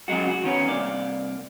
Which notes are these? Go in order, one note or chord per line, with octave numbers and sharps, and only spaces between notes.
C#3 F3 F#3 G#3 F#4
F#4
D#3 B3 C#4
C2 A#3 D5